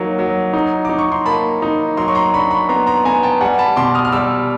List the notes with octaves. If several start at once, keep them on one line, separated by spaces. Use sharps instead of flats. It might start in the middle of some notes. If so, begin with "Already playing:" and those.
Already playing: F#3 A#3 D#4
F#3
D#4
D#4 D6
C#6
C6
A#3 A5 B5
D#4
F#3 A#5 C6
C#6
A#5 C6
D4 B5 C#6
B5 C#6
B3 A#5 C6
A#5 C6
B3 G#5 A#5
G5 A5
G3 F#5 G#5
A5 B5
B2 C6 D6
D#6 F6
F6
G3 D6 E6